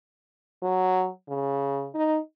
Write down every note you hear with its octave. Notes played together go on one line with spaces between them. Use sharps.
F#3
C#3
D#4